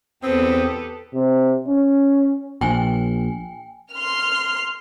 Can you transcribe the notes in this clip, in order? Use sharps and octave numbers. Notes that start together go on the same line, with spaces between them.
E2 C4 G4 A4 B4 G5 D#6
C3
C#4
A#1 G5 G#5
C6 F6